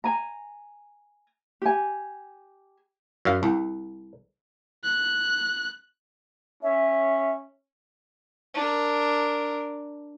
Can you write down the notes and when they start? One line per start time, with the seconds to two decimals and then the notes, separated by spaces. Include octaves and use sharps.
0.04 G#5 A#5
1.62 G4 G#5
3.25 F#2 F5
3.43 C2
4.84 F#6
6.63 C#4 E5
8.54 D4 A#4